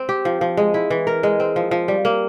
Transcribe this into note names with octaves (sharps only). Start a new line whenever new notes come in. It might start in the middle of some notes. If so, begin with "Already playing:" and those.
Already playing: C4
G4
F3
F3
G#3
E4
E3
A#4
G#3
C4
F3
F3
G3
A#3